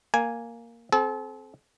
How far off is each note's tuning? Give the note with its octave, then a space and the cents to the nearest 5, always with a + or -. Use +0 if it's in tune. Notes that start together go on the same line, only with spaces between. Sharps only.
A#3 +0 G#5 +0
C4 +0 A4 -40